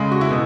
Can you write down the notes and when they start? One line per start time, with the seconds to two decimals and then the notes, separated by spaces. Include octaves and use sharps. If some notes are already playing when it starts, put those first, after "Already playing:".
Already playing: C#3 G#3
0.11 F#4
0.21 E4
0.30 B2